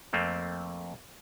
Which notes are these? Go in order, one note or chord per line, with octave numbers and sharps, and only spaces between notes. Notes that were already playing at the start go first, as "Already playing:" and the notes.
F2 A3 A#3 C4